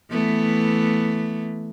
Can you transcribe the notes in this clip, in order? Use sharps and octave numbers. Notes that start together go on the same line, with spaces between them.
E3 A3 B3